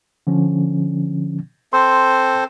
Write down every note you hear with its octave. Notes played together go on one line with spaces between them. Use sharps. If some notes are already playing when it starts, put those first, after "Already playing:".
D3 F3 C#4
C4 A4 C5 C6